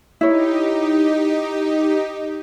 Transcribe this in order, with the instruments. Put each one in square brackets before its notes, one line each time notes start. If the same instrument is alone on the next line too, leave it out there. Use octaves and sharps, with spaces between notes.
[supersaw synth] D#4 G4 [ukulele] E4 C#5